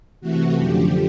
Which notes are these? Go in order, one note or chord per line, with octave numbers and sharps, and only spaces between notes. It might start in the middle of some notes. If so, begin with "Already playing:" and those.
C3 E3 A3 F#4
F#2 D3 F3 G4